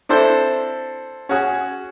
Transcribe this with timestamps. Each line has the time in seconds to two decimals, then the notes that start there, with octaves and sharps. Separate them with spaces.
0.09 C4 D4 E4 A4 C5
1.29 C#4 F#4 G#4